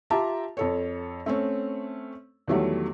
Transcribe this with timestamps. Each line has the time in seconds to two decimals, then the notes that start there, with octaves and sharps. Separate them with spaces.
0.10 F4 G4 E5 A5 A#5
0.57 F2 A4 C#5
1.26 A3 C4 C#4
2.48 E2 D#3 F#3 G3 A3